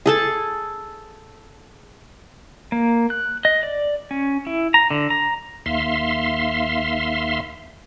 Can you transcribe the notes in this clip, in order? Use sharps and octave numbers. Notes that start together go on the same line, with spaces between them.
G#4 A4 A5
A#3
F#6
D#5
D5
C#4
E4
A#5
D3
A#5
D#2 E5 F5 C6